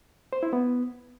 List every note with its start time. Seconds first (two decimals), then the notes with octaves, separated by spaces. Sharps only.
0.33 C5
0.43 E4
0.53 B3